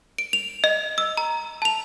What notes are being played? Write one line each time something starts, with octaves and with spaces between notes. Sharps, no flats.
D7
F7
D#5
E6
A#5
A5 F7